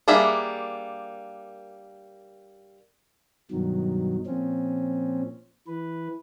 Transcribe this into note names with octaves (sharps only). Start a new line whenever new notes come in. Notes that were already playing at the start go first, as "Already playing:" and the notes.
G3 A#3 D4 G#4 E5
G2 B2 D#3 F#3
A#2 F3 C4 C#4
E3 B4